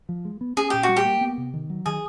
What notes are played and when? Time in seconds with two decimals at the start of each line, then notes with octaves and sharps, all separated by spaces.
0.09 F3
0.25 G#3
0.41 B3
0.57 C#4 G#4
0.70 A#2 G4
0.83 F#4
0.89 G3
0.97 G4
1.05 A#3
1.21 B3
1.38 C3
1.54 D#3
1.70 F#3
1.86 D#3 G#4